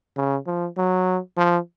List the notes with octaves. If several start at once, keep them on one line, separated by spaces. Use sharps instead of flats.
C#3
F3
F#3
F3